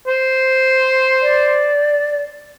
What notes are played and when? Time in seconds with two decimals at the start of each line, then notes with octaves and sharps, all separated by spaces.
0.07 C5
1.22 D5